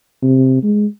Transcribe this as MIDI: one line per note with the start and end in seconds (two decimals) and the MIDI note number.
0.23 0.59 48
0.63 0.86 56